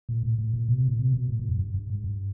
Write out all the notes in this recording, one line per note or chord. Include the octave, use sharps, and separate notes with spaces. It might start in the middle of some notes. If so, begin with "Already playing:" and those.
A#2
A2
A2
A#2
B2
C3
A#2
C3
B2
A2
A#2
F#2
G2
G2
G#2
G2